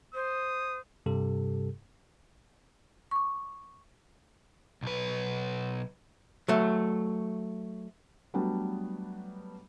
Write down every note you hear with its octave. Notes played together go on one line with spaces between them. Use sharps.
C5 D#6
G2 C3 G3 G4 A4
C#6 D6
B1 B4
F#3 A3
F#3 G3 A3 B3 D4